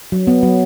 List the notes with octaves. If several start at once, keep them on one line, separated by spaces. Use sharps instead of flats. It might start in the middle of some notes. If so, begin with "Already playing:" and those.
F#3
B3
F#3